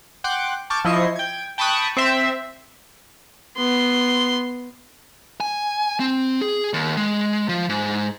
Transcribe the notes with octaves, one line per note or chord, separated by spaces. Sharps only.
F#5 G5 C6 D6 F#6
A5 C#6 D6 F6 G6 A6
F3 E4 D#5 C#6 C7
G5 G#6
G5 A5 B5 C#6 D#6 F#6
C4 C5 E5
B3 C6
G#5
C4
G#4
D#2
G#3
F3
G#2